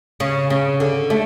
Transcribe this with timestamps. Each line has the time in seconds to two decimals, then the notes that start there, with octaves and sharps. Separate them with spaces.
0.20 C#3
0.50 C#3
0.80 D3
1.10 A3